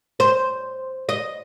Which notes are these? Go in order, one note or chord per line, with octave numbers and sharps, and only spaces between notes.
C5
D#5